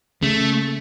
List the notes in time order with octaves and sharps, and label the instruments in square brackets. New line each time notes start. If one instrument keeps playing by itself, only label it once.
[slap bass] C#3 [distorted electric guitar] A3